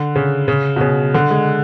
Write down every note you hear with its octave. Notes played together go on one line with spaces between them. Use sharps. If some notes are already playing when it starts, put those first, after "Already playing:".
Already playing: D3
C#3
C#3
B2
C#3
D3
G#3